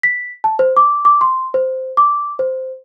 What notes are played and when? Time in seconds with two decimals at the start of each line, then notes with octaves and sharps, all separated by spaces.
0.03 B6
0.44 A5
0.59 C5
0.77 D6
1.05 D6
1.21 C6
1.54 C5
1.97 D6
2.39 C5